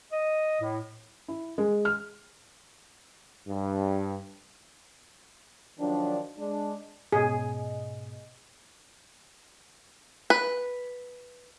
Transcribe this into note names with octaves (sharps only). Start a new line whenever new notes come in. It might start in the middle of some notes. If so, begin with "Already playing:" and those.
D#5
A2
E4
G#3
F6
G2
D#3 F3 F#3 D4
G#3 D4
G#2 B2 G#4 D#5
B4